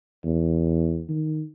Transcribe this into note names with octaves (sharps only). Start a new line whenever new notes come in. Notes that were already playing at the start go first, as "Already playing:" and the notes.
E2
D#3